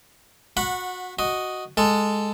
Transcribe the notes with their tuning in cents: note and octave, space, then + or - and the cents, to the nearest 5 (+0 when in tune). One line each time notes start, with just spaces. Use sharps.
F#4 -25 F#5 -10 B5 +0
F#4 +0 D#5 +0
G#3 -5 A4 +0